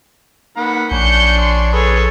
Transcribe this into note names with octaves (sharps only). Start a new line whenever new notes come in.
D#3 A#3 F#5 B5
A#1 D4 C#5 G#5 G6 C#7
C6
G#4 A4 B4 C#5